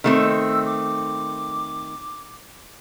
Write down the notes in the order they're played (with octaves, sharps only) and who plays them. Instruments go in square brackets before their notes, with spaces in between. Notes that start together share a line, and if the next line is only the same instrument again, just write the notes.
[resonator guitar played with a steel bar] D#3 A3 C4 [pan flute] E6
[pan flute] D6